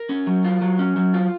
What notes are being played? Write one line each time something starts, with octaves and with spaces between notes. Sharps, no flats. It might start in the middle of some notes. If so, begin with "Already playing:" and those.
Already playing: A#4
C#4
F#3
F4
F#3
C#4
F#3
F4